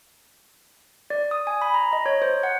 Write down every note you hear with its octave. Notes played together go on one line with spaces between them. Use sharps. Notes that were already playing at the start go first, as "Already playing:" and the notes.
D5
D#6
G#5
B5
A#5
D#5
C#5
C5
F#5